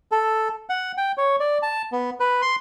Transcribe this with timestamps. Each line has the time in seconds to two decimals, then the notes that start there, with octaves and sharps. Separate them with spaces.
0.12 A4
0.69 F#5
0.97 G5
1.18 C#5
1.40 D5
1.63 A5
1.92 B3
2.20 B4
2.42 C6